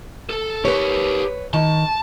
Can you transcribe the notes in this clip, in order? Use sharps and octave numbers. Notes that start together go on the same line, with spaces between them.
A4
G4 A#4 B4 C#5
D#3 A5